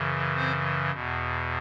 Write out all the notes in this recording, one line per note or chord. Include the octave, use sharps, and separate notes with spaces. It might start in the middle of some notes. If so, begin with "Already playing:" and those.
Already playing: F#2 C#3 E3
C4 C5
E2 B2